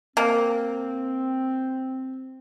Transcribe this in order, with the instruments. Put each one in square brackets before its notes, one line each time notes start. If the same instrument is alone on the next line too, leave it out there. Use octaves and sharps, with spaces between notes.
[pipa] A#3 [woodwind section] C4